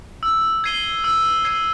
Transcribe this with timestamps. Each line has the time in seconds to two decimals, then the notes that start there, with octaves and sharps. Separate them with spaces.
0.23 E6
0.64 G#6 C7 D#7 G7
1.04 E6
1.45 G#6 C7 D#7 G7